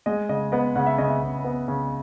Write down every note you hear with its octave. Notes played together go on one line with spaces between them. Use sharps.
G#3 D#5
C#3 D#5
B3 D#5
C#3 F#5
E5
C#3 D#5
E5
C#3
B3
C#3